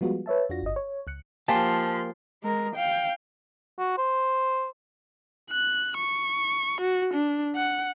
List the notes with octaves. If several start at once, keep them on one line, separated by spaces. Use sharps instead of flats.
F3 G3 G#3 B3 F4 F#4
B4 C#5 E5 A5
F2 D4 F4 F#4 A#6
G1 D#5
C#5
C#2 F#6 C#7
F3 A#3 G4 C5 F5 G#5 A5 C6
G#3 A#4
F5 G5
F#4
C5
F#6
C#6
F#4
D4
F#5